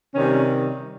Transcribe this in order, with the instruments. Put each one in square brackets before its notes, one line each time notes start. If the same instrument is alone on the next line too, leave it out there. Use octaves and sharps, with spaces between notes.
[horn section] C3 D#3 G3 C#4